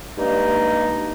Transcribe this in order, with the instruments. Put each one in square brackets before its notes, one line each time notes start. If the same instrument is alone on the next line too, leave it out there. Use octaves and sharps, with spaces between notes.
[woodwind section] G2 G#3 A#3 D#4